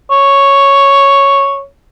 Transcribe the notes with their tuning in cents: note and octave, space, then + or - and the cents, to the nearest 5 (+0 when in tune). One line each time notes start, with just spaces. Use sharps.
C#5 +0